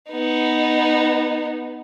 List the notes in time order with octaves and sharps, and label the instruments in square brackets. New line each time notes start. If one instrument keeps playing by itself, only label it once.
[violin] B3 D#4